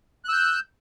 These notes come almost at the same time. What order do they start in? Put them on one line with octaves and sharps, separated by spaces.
F#6 E6 G6